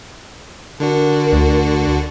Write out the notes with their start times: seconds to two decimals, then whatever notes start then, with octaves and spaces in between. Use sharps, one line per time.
0.80 D3 D4 F#4 A#4
1.33 D2